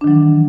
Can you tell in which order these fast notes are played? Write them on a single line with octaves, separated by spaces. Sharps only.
D4 D#3 F#3 E3